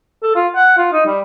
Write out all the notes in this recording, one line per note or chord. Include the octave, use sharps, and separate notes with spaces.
A4
F4
F#5
F4
D#4
G3